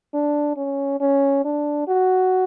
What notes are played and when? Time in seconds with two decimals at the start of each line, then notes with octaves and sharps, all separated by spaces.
0.14 D4
0.57 C#4
1.00 C#4
1.45 D4
1.88 F#4